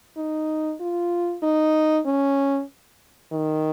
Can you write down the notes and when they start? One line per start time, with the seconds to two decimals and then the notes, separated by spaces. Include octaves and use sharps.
0.17 D#4
0.80 F4
1.43 D#4
2.06 C#4
3.32 D#3